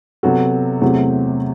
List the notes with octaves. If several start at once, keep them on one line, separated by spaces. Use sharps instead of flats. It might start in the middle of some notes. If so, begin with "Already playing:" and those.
C3 F#3 B3 F#4 A4
E2 C3 F#3 A3 C4